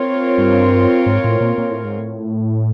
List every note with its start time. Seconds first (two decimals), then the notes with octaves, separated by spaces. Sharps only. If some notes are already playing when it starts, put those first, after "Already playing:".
Already playing: C4 F4 A#4 C#5
0.38 G2
1.06 G#2
1.24 A2
1.41 A#2
1.58 A#2
1.71 A2
1.84 G#2
1.98 A2